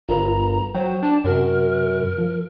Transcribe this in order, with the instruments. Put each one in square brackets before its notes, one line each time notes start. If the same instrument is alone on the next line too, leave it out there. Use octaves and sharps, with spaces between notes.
[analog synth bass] G1 [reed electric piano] F4 A#4 B4 [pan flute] A#5
[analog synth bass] F#3 [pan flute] C5 [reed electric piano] G5
[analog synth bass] D4 [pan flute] A5
[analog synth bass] F#2 [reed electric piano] C3 F#4 [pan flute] A#4
[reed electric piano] F3